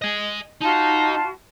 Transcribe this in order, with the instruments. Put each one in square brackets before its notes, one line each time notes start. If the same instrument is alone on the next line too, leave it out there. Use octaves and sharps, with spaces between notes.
[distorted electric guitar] D#5 G#5
[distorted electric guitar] D#4 [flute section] F4 F#4 A5